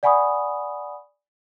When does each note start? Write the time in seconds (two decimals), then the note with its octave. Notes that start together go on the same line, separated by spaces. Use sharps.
0.03 D5 F#5 G#5 B5 C#6 D#6